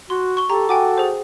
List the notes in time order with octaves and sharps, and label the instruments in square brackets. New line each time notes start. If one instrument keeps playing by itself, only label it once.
[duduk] F#4 [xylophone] C6
[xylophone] C#6 G7
[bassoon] G4 [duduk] A4 [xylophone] A#5
[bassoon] F#4 [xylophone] G5 G#5 D6
[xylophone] G#4 C5